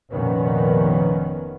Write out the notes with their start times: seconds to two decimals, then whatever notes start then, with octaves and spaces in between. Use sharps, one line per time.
0.12 F1 F2 A#2 D#3 B3 C#4